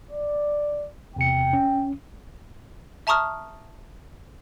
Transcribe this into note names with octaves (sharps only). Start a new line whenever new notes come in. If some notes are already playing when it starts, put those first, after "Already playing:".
D5
E2 C3 G5 C#7
C#4
E5 A5 A#5 C#6 D#6 F6